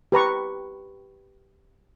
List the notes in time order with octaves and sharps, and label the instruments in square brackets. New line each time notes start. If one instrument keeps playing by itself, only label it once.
[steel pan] G4 B4 A#5 C#6